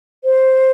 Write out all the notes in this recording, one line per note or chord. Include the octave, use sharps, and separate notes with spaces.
C5